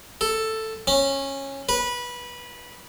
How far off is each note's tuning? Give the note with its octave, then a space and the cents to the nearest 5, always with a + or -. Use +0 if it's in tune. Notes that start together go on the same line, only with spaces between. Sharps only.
A4 +5
C#4 -15
B4 -20